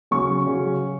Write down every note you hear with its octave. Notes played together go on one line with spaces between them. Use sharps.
C#3 F#3 C#4 C#6
C#3 F#3 C#4